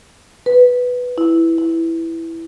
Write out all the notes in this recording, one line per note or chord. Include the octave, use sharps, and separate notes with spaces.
B4
E4
E4